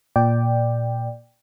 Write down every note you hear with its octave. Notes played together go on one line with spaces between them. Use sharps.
A#2 D5 G5